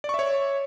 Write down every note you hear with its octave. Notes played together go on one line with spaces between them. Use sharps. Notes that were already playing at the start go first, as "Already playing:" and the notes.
C#5 D5 E5 C#6